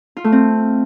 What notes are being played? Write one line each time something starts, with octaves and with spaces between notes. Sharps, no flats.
F4
A3
C4